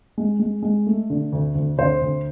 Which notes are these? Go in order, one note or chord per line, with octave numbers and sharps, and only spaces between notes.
G#3
G#3
G#3
A3
D3
D2
D2
D2 C5
D2